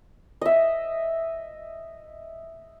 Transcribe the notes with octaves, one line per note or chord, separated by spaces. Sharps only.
D#5 E5